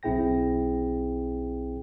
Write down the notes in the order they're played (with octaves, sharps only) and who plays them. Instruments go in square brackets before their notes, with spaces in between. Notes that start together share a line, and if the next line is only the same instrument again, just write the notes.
[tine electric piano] B1 C4 E4 G#4 G5 A#6